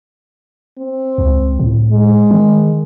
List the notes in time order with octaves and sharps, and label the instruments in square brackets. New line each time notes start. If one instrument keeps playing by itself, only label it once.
[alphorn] C4
[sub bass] C#2
A2
[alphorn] G#3
[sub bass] D#3